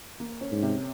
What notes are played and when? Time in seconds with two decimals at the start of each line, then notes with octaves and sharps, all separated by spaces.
0.20 A#3
0.41 C#4
0.51 G#2
0.63 C3